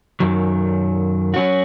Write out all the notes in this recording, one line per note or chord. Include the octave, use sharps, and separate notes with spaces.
F#2 D#3 F#3
F#3 C#4 F#4